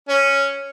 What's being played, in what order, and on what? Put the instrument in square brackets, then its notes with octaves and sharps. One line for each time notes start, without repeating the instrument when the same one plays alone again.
[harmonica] C#4